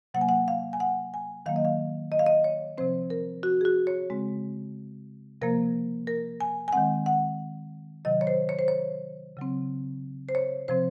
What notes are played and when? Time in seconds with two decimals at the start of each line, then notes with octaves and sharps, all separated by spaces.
0.14 C3 F#3 A#3 F#5
0.21 G#5
0.29 F#5
0.48 F5
0.73 G#5
0.80 F#5
1.14 G#5
1.46 D#3 F#3 A#3 F5
1.56 D#5
1.65 F5
2.12 D#5
2.19 F5
2.26 D#5
2.44 C#5
2.78 C3 F3 C4 C5
3.10 A#4
3.43 F#4
3.61 G#4
3.65 F#4
3.87 C#5
4.10 C#3 G#3 C4
5.42 C3 F3 A#3 A#4
6.07 A#4
6.41 G#5
6.68 G#5
6.73 D#3 G#3 C4 F#5
7.06 F#5
8.05 C3 D#3 F#3 D#5
8.21 C#5
8.27 C5
8.49 C#5
8.59 C5
8.68 C#5
9.37 C#3 F#3 C4
10.29 C5
10.35 C#5
10.68 C3 F3 C4 C5